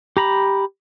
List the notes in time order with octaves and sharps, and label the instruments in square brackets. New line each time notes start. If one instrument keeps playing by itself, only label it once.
[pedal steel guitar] G4 A#5 B5